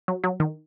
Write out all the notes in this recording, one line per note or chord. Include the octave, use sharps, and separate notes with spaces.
F#3
F#3
D#3